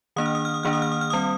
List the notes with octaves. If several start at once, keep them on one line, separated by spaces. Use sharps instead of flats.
D#3 A#3 D4 D#6
F6
D#6
F6
D#6
D#3 A#3 D4 F6
D#6
F6
D#6
F6
G3 C4 D#6